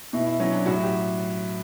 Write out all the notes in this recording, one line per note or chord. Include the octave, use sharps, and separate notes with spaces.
B2 E4
E4
F#3 C#4
D4
A2 F#4
G4